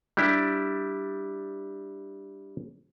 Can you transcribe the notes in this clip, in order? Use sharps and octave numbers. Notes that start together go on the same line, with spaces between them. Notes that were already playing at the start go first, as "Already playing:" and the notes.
G3 D4 E4 G4